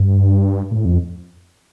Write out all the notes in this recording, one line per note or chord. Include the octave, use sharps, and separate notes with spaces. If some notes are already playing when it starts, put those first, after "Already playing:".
Already playing: G2
A2
F2